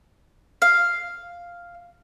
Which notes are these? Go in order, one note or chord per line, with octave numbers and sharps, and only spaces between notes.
F5